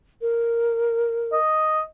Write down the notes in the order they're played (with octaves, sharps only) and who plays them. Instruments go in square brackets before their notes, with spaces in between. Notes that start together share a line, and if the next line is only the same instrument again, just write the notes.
[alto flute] A#4
[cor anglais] D#5